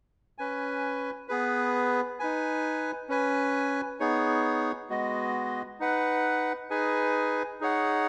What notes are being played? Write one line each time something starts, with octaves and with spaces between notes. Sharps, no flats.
C#4 B4 G#5
B3 G#4 B4
D#4 B4 G#5
C#4 B4 G#5
B3 D#4 G#4 C#5
G#3 B3 F#4 D#5
D#4 B4 F#5
D#4 G#4 B4 G#5
D#4 G#4 C#5 F#5